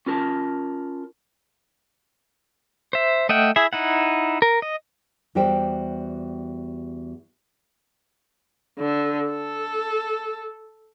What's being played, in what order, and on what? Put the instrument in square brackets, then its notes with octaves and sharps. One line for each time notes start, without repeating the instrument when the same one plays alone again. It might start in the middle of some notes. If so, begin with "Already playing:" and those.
[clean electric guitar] C#4 F4 A#4 A5
[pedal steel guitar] C5 E5
A3 D#5 E5 F#5 G5
E4 G#4 E5
D#4 E4 F#5
A#4
D#5
[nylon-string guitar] E2 G3 F#4 G4 C5 G5
[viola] D3
A4